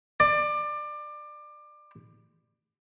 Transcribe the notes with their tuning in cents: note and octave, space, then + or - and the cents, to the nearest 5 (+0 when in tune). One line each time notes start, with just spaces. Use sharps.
D5 +25